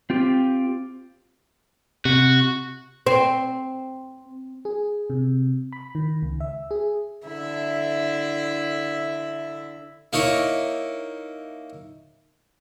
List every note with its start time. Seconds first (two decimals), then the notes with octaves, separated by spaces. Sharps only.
0.10 C4 F4 G4
2.05 C3 F#4
3.07 C4
4.65 G#4
5.10 C3
5.72 B5
5.95 D#3
6.22 C#2
6.40 E5
6.71 G#4
7.25 D3 E4 E5
10.13 A#3 D#4 E4 C#5